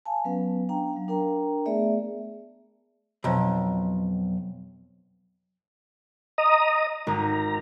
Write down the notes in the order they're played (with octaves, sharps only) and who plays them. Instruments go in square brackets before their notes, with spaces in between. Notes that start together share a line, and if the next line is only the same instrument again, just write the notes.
[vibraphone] F5 G#5 A5
F#3 B3 C#4 B4 F5
D4 F5 G5 A#5
F#3 F5
D4 A#4 G5 A#5
A3 B3 G#4 D5 E5
[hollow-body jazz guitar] B1 F2
[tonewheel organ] D#5 A#5 D#6
[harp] G#1 [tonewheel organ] A#5